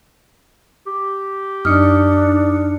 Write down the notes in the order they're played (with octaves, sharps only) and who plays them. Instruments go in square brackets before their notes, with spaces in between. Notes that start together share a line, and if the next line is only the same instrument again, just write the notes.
[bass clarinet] G4
[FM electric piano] F#2 D#4 C#7 [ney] D4 [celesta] D#6 F6